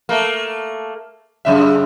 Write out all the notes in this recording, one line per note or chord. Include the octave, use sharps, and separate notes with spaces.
A3 A#3
F#2 C#3 E5